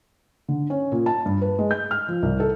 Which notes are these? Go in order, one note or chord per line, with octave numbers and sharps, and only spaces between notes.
D3
C#4
A#2
A5
G2
B4
G#3
G6
F6
F3
C2
A4